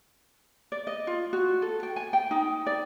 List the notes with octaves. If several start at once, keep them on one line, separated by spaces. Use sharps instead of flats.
D5
D#5
F4
F#4
A4
G5
G#5
G5
D#4
D5